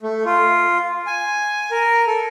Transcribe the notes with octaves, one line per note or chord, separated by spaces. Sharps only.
A3
F4
G#5
A#4
A4